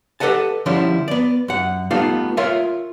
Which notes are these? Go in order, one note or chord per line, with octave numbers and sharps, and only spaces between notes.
G4 A4 B4 D#5 F#5 A5
D3 F3 G3 C#4 E4
B3 D5
F#2 F#5
G3 A3 B3 D#4 F4 F5
F4 A#4 C#5 E5 F5